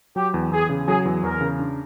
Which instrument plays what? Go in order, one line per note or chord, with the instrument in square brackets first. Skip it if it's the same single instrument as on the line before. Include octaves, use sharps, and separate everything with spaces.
[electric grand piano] F#3 [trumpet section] G4
[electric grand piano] E2
[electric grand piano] E2 [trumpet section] G#4
[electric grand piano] C#3
[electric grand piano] F#3 [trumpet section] G#4
[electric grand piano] E2
[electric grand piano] E2 [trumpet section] A#4
[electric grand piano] C#3
D4